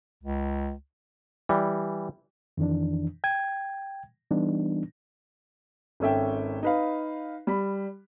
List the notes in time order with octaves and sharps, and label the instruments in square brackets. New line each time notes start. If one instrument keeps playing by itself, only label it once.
[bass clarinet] C#2
[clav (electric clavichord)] E3 G3
[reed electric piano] F2 D#3 E3 D4
G5 G#6
E3 G3 B3 D4 D#4
[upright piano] G#1 C#4 A4 E5 G5
D#4 B4 F5
G3 B5